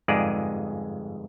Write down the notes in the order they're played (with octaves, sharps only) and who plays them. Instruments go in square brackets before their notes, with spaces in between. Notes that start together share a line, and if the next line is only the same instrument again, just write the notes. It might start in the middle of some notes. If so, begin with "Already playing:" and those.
[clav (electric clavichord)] G1 F2 G#2 G#3 G#4 D5